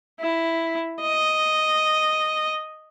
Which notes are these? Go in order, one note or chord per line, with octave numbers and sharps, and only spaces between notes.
E4
D#5